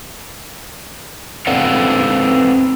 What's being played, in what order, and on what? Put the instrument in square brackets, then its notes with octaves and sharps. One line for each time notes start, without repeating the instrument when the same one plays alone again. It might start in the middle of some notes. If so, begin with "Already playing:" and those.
[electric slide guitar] C4 A4 B4 D5 F5 F#5